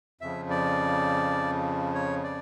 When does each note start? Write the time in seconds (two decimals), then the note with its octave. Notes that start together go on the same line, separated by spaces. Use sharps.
0.21 F2 C#3 F3 E5
0.50 D5
1.95 C#5
2.24 D5